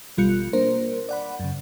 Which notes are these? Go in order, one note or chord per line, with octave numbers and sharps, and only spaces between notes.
A1 B2 G3 F4 F#6 C#7
A#3 D4 A#4 C5
D5 F#5 B5
F#2 C#3